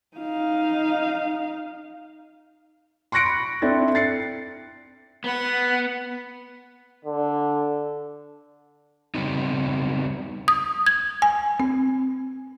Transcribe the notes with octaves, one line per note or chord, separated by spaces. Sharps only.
D#4 F5
C6 C#6 F#6 A#6 C#7 D7
B5
C4 D4 E4 A4
A6 C7 C#7
B3 B4 F#5
D3
C#3 G3 B3 C4 D#4
D#6
G#6
G#5
C4